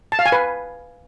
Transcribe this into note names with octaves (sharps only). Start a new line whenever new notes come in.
A5
F5
G#5
B4